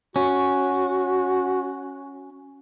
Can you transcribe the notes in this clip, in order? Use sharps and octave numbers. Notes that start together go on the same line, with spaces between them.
C#4 F#4